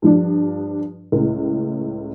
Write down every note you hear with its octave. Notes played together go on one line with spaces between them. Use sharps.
G2 F3 D4
C#2 A2